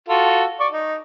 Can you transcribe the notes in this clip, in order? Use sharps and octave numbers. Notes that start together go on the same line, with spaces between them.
F4 F#4 A4
D5 C#6
D#4